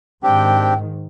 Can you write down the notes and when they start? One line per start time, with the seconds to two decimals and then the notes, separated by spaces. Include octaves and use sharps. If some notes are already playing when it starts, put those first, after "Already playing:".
0.23 G#2 D#3 C4 D4 G4 G5